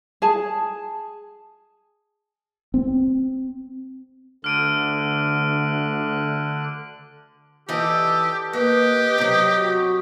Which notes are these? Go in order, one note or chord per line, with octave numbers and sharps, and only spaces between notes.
G#4 A5
C4
D2 D3 F6 F#6 D7 D#7
E3 G4 A4 D5 D#5
A#3 G4 B4 D#5
C3 F#3
F#4